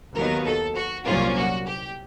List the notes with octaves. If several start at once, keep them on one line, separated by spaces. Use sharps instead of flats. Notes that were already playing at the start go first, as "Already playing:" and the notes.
D#2 D#3 F#3 B3 D#4 A#4
A4
F#4
C2 A#2 F#3 A#3 C#4 F4
F#4
G4